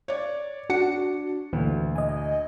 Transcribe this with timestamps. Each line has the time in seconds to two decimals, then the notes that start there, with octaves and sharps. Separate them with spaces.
0.08 C#5 D5
0.70 D4 F#4 C#7
1.53 D2 A#2 E3 F#3
1.96 D#5 G#5